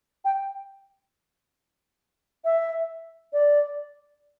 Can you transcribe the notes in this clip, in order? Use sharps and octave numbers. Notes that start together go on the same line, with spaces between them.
G5
E5
D5